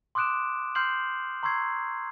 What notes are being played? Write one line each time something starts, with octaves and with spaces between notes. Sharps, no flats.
C6 D6 D#6 F#6 D7 E7
C6 F6 G6 C7 F#7
A#5 C6 C#6 E6 G#6 C7